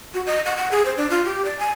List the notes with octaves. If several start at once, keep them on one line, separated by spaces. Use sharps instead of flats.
F#4
D#5
F#5
F#5
G#4
C5
D4
F4
G4
D5
G#5